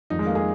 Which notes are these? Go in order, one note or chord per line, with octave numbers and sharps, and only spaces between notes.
F1 F2 D#3 D#4
G#3
A#3
G#4